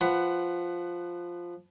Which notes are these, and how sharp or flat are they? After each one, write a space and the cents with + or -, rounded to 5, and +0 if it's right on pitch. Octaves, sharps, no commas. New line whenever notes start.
F3 +0 B4 +15 F#5 +10